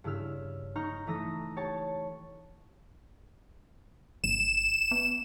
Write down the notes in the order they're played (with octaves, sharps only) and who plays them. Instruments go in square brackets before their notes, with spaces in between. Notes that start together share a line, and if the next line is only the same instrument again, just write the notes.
[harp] G2 C#3 E4 E6 F6
D#4 A#5 C#6 F6 G6
E3 A3 A#5 D#6 E6 A#6
G4 C#5 A5
[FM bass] G1 [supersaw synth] E7
[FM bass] B3